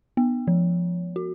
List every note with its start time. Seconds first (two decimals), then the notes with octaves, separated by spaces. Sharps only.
0.17 B3
0.47 F3
1.16 F#4